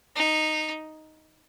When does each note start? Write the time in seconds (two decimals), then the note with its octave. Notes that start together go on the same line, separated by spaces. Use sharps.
0.16 D#4